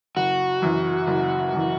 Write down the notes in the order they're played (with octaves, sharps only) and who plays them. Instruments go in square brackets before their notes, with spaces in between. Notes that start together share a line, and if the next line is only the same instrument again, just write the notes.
[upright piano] F#1 [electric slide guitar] F#4
[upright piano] F#2 E3
F#1
F#2 E3